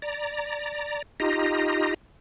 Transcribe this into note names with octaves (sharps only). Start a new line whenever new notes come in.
D5 A#5
D#4 F4 G4 D#5 A#5